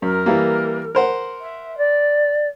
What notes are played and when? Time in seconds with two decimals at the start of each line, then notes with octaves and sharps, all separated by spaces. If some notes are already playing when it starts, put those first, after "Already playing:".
0.02 F#2 A#4
0.26 E3 G3 A#3
0.95 A#4 C5 F#5
1.41 E5
1.77 D5